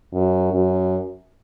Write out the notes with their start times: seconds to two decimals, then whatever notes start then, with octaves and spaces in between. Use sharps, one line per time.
0.14 F#2
0.53 F#2